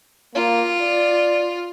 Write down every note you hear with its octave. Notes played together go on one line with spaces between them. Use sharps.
A#3 F4
D5